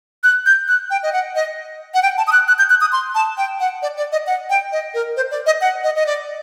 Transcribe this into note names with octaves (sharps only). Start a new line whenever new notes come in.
F#6
G6
F#6
G5
D#5
F#5
D#5
F#5
G5
A5
D#6
F#6
F#6
G6
F#6
D#6
C6
A5
G5
F#5
D5
D5
D#5
F#5
G5
D#5
A#4
C5
D5
D#5
F#5
D#5
D#5
D5